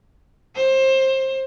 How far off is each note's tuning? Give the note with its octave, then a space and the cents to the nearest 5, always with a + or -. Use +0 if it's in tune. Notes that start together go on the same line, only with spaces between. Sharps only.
C5 +25